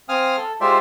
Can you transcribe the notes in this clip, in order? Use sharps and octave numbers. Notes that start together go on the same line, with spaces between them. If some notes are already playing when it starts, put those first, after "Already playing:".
C4 F5 G#5 D#6 F6
A4
G#3 F4 G4 C5 D5 E5